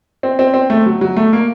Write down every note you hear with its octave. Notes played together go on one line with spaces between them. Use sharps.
C4
C4
C4
A3
F#3
F#3
A3
A#3